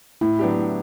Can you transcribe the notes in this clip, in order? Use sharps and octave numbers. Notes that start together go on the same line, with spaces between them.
A2 E4
F#3 B3 D4 G4
A2